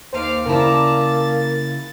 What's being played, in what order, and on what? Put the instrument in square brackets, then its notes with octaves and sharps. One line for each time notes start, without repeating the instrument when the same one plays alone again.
[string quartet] D#2 F5 D6 [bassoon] C5
[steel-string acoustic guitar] C#3 E4 [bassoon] A#3 [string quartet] D5 A5 A#5
[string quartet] A6